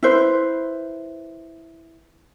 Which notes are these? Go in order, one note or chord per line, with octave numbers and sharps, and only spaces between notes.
E4 B4 C5